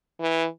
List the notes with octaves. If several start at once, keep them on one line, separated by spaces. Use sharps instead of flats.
E3